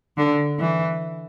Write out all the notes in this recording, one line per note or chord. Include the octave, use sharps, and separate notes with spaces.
D3
E3